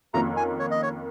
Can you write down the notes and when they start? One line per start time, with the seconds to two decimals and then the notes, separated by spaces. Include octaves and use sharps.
0.14 F2 D#3 A#3 C#4 A#5
0.36 G#5
0.59 C#5
0.71 D#5
0.82 C#5